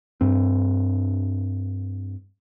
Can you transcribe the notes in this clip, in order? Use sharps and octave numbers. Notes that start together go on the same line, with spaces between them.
G2 C4